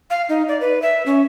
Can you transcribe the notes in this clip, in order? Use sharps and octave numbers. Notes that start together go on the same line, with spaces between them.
F5
D#4
D5
B4
E5
C#4